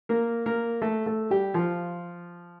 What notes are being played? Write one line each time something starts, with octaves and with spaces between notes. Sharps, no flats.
A#3 A#4
A#3 A#4
A3 A4
A3 A4
G3 G4
F3 F4